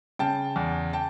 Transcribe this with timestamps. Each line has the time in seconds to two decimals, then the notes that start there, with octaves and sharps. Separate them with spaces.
0.19 C#3 G5 A5
0.56 E2
0.93 G5 A5